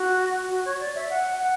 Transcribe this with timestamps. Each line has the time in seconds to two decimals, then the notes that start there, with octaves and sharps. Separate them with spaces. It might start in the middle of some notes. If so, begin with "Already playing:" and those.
Already playing: F#4
0.50 F#4
0.65 C#5
0.80 D5
0.95 E5
1.10 F#5
1.39 F#5